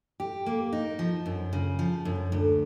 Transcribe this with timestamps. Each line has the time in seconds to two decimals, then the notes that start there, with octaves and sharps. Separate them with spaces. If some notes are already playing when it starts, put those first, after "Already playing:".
0.20 G4
0.46 A#3
0.73 D#4
0.99 F3
1.26 F#2
1.53 C#3
1.79 F3
2.05 F#2
2.32 D2